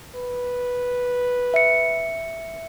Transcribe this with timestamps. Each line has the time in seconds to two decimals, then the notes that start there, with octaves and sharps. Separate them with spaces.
0.15 B4
1.54 E5 C#7